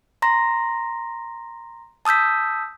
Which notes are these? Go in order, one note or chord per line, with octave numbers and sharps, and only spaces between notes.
A#5 C6 A#6
A5 D#6 E6 G6 B6